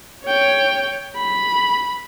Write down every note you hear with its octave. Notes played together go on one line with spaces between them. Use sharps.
C#5 G5
B5